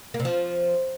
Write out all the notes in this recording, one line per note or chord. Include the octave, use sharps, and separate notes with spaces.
A#3
C3
F3